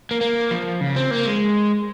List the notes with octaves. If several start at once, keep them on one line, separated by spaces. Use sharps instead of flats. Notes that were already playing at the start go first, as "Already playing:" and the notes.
A#3
A#3
F3
C#3
C4
A#3
G#3